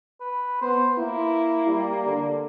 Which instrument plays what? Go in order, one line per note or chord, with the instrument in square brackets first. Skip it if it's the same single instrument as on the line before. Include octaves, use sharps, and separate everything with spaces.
[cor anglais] B4
[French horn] B3 [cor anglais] C5
[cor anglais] A#3 [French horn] E4
[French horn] G3
D3